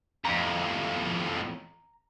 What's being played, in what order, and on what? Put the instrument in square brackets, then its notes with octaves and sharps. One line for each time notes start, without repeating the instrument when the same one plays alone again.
[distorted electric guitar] F2 A2 [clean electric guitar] A#5